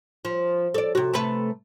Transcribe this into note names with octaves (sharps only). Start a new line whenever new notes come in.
F3
A4 D5
C3 F#4
C3 A3 B4